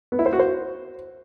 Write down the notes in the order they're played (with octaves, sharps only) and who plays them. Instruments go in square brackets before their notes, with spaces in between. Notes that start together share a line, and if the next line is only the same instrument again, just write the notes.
[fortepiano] B3
E4
C5
F#4
C5